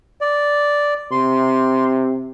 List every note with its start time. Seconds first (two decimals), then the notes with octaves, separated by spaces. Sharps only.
0.21 D5
1.11 C3 C6